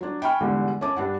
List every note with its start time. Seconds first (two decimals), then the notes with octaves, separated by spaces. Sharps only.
0.01 F#3 D4
0.22 G5 G#5 B5 C#6 F6
0.41 E2 G#2 D3 G3
0.81 C#4 A5 D6
0.96 G2 D4 F#5